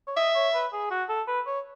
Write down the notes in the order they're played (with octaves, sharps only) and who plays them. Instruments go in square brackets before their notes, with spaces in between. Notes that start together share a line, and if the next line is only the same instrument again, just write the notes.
[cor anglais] C#5
[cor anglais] D#5 [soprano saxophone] E5
[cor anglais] C#5
B4
G#4
F#4
A4
B4
C#5